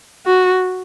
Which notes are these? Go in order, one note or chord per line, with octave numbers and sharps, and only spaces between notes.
F#4